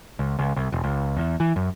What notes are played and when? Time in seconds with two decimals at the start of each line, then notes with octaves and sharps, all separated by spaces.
0.19 C#2
0.39 C#2
0.57 C2
0.72 E1
0.84 C#2
1.17 E2
1.40 E3
1.56 F#2